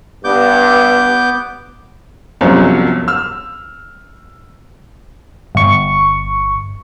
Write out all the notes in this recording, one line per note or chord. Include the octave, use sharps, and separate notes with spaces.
G2 B3 D6 G6
G1 C2 F#2 F3 F#3
E6 F6
G1 C#6